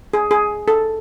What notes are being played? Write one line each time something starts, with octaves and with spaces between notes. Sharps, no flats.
G#4
G#4
A4